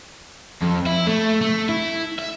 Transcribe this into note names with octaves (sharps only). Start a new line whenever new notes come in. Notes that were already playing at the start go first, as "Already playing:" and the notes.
F2
E4
A3
A3
E4
E5